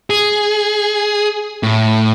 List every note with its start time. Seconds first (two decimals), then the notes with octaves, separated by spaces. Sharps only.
0.10 G#4
1.63 A2